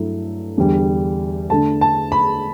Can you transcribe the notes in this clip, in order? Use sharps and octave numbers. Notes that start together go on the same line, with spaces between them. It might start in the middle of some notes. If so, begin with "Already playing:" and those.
Already playing: G2 F#3 A3 E4
E2 D3 G3
D3 A3 D4 A5
A5
B5